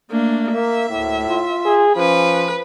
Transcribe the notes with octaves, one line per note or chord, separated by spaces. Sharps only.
A3 A#3 D4
A#3 E5
D2 A2
F4
G#4
F3 C#4 B4